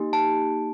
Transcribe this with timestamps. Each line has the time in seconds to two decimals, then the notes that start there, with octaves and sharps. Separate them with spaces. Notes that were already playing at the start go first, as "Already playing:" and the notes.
Already playing: A#3 D#4 G4
0.13 A5